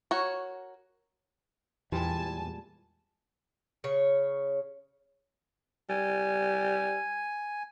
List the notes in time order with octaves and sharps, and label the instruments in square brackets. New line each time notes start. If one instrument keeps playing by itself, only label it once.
[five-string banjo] F#4 A#4 C#5
[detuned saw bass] E2 [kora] A#2 G3 G#3 [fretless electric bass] E3 [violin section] G#5 A5
[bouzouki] C#3 C#5
[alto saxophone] G3 [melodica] G#5